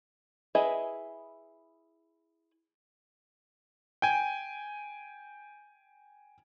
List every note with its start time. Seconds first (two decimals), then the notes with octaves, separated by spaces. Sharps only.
0.55 E4 G#4 B4 D#5 E5
4.02 G5 G#5